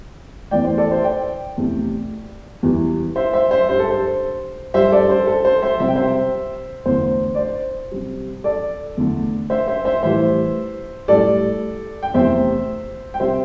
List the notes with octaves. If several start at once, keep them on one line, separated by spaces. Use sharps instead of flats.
E2 E3 A3 D5 G5
C5
A4 D5
C5 E5
D5 G5
E2 C3 A3
E2 E3 G3
C5 E5
C5 E5
C5 E5
G2 G3 C5
A4
C5
G2 G3 C5 E5
A4 D5
C5
A4
C5
C5 E5
C3 G3 E5
G5
C5 E5
E2 D3 A3 C5
D5
C5
C3 G3
A4 D5
E2 D3 A3
C5 E5
C5 E5
C5 E5
A2 E3 G3 C5 E5
A2 G3 A4 D5
G5
E2 C3 A3 C5 E5
G5
C3 G3 C5 E5